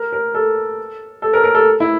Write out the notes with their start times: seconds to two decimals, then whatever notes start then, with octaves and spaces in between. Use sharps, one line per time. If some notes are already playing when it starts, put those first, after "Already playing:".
Already playing: A#4
0.12 A#4
0.34 A4
1.22 A4
1.33 A#4
1.44 A#4
1.55 A4
1.80 E4